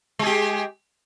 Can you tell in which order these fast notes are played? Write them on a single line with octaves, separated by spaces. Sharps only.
G#3 G#4 G4